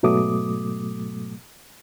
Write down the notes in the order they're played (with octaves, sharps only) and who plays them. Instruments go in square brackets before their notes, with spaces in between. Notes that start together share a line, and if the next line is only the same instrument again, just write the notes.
[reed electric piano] G#2 B2 F#3 A3 D6 D#6